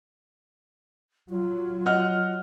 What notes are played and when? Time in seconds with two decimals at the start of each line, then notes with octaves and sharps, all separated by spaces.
1.30 F#3 F4
1.86 D#5 F#5 F6